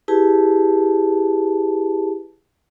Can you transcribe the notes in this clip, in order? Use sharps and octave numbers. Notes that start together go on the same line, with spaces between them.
E4 G4 G#4 B4 A5